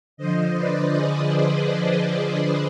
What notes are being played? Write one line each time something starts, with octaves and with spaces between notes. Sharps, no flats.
D3 F3 C5 D#5
B4 D5
G#4 C5